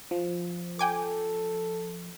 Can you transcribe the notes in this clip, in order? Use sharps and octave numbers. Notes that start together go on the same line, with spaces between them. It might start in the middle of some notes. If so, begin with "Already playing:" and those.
F3
A4 G5 G#5 D6